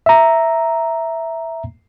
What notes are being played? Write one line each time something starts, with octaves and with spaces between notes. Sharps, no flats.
E5 A#5